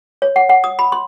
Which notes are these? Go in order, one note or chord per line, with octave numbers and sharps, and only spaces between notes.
C#5
F#5
F#5
D#6
B5
C6